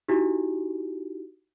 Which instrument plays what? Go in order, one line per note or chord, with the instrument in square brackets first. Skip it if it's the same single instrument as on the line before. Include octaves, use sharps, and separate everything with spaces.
[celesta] D#4 E4 F#4 G4